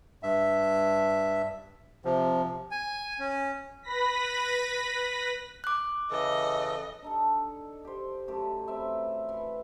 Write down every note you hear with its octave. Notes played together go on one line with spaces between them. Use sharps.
G2 E5
C3 F3
G#5
C#4
B4 B5 A#6 B6
D6 F#6
C#3 E3 A4 D#5
D4 D#4 A4
G4 C5
F#2 A3 G4
C4 B4 E5
E3